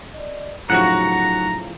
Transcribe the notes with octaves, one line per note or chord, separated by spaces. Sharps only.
D5 D#5
A2 C#3 F3 F#3 D#4 F#4 F#5 A#5